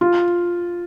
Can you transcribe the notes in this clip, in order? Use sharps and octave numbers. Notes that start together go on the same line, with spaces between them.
F4